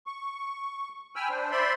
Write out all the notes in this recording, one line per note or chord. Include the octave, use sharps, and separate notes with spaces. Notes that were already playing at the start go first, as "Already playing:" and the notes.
C#6
G5 G#5 B5 E6 F6
D4 C5
C5 D5 E5 B5 C6